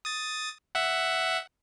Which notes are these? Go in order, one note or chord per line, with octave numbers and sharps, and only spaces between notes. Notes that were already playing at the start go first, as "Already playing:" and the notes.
D#6 A6
E5 F#5